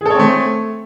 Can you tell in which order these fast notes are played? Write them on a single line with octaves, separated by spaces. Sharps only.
G#4 A4 C#5 C4 A3